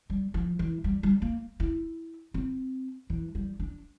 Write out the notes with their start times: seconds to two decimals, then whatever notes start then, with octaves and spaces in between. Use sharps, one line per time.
0.10 G3
0.34 F3
0.59 E3
0.84 G3
1.03 G3
1.22 A#3
1.60 E4
2.34 C4
3.10 E3
3.35 G3
3.59 D4